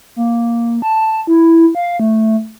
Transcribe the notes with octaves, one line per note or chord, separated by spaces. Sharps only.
A#3
A5
E4
F5
A3